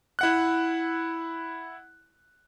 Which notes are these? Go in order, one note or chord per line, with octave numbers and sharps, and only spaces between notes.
E4 F#5 F#6